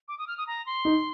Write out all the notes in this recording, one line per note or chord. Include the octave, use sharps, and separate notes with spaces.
D6
D#6
F6
D#6
A#5
C6
D#4